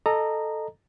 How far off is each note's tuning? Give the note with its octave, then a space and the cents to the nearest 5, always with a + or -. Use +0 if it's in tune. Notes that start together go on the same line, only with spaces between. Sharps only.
A4 +0 D#5 -20 A#5 -5